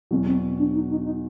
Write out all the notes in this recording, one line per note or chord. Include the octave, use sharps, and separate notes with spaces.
E2 B2 F#3 C4
C4
D4
D#4
D#4
D#4